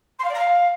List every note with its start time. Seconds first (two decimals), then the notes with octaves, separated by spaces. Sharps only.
0.19 C6
0.24 F5
0.29 D5
0.34 A#5
0.39 F5